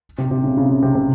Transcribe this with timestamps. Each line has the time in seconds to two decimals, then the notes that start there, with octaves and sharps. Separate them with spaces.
0.18 C3
0.31 C3
0.44 C#3
0.57 C#3
0.69 C#3
0.83 C3
0.95 C3